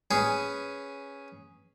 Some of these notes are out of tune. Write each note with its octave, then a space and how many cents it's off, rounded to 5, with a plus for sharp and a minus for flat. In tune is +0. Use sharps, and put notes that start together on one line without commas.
C#4 +0 G#4 +0 B4 +0